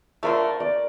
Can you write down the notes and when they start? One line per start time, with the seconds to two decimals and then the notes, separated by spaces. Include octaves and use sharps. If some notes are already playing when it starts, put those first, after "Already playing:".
0.23 D3 F3 A3 A#4
0.60 D5